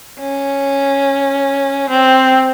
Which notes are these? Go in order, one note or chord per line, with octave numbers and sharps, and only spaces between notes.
C#4
C4